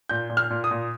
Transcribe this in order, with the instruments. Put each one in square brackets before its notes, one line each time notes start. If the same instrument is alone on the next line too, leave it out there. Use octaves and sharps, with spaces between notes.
[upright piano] A#2 G6
A#2
F6
A#2
D#6
A#2